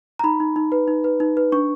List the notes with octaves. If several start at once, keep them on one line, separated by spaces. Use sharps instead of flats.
A#5
D#4 B5
D#4
D#4
B4
D#4
B4
D#4
B4
D4 C#6